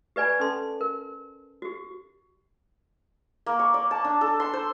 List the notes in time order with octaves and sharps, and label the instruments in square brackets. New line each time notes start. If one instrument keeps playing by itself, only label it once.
[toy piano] G4 B4 D5 G#5 B5
C#4 A4 A5 C6
A#4
F#4 G4
[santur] A#3
C#6
D5
A5
D4
A4
C6
C5